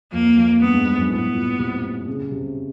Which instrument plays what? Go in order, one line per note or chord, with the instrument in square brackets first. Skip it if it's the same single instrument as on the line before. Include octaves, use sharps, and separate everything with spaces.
[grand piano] F2 [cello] A#3
[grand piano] F2
[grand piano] G2 [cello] B3
[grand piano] G#2
G2
F#2
[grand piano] A2 [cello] B3
[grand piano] A#2
C3
C#3
C3